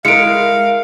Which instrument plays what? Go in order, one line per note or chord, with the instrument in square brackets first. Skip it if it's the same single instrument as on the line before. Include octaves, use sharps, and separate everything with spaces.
[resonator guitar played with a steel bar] G#3 [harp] E4 A#4 [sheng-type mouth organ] F5 [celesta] C#7 D7